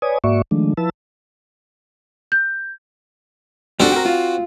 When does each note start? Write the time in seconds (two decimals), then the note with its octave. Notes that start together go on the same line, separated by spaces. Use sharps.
0.02 B4 C#5 D5 G#5 D#6
0.24 G#2 A#3 F#4 D5 E5 C#6
0.51 D#3 F3 G#3 A3 D4
0.77 F3 E4 B4 A5 E6
2.32 G6
3.80 G3 C4 D4 F#4 A4
3.92 G4 A#4
4.06 F4